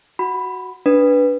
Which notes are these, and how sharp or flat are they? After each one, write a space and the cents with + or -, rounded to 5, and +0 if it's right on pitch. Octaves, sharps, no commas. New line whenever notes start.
F#4 +0 B5 +0
D4 -15 B4 -5